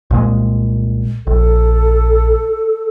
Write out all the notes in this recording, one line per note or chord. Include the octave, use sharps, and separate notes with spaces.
C2 A#2 G#3
A#1 A4